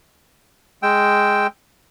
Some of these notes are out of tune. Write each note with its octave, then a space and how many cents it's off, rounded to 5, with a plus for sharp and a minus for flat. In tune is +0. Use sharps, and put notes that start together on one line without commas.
G#3 +0 G5 +0 E6 +0